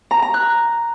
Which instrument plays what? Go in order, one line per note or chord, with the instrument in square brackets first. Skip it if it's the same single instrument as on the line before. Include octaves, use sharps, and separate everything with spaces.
[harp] A#5
A#5
F#6